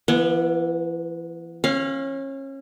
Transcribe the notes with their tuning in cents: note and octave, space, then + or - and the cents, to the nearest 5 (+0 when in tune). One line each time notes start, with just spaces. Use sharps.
E3 +35 B3 -20
C#4 -30 F5 +0